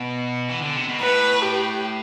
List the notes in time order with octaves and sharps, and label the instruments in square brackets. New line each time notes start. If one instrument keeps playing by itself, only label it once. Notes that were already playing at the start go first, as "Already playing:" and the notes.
Already playing: [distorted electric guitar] B2
E3
D3
C3
B2
[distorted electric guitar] A2 [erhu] B4
[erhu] G4